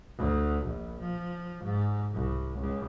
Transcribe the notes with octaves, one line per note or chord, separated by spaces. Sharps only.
D2
A#1
F3
G#2
C2
C#2